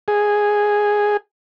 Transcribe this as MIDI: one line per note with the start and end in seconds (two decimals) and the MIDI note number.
0.08 1.17 68